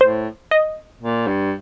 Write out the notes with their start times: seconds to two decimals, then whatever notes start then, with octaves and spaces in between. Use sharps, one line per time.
0.01 A2 C5
0.51 D#5
1.01 A#2
1.27 G2